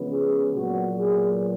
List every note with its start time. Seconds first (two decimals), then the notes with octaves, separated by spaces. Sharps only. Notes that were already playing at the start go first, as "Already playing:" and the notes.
Already playing: C#3 F3 G#3 B3
0.10 G#4
0.54 A#2 F#3 B3 F#4
0.98 G#4